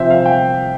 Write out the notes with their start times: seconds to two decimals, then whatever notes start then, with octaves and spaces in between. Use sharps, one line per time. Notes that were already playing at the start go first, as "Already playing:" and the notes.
Already playing: C3 F3 C5 E5
0.10 F5
0.26 G5